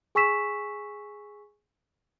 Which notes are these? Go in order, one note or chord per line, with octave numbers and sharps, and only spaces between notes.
G#4 G#5 C#6 E6 B6 E7